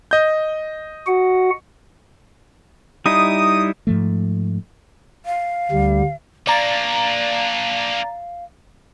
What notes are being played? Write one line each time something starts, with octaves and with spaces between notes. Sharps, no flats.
D#5 G6
F#4 F#5
G3 D#4 E4 D#6
G#2 F3 A3
F5
D2 G3
A#3 D4 D5 F5 A#5 A6